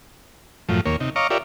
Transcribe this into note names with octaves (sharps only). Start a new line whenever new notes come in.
F#2 A2 F3
D#2 A#3 C#5
C3 D#4
C#5 D#5 F5 A#5 C#6 D6
F4 G4 A#4 C#5 D5 E5